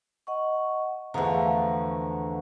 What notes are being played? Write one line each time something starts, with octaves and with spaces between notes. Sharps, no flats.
D#5 F#5 C#6
E2 D3 F3 A3 F#4 A#5